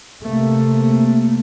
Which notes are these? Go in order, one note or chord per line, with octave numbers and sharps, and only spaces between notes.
C3 A3 A#3